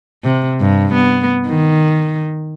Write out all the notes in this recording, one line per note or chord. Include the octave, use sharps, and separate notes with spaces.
C3
G2
B3
D#3